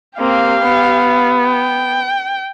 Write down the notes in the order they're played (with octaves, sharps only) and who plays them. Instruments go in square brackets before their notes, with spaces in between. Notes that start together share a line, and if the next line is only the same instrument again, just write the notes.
[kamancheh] A#3 C4 [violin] G4 F5
[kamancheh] B3
[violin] G5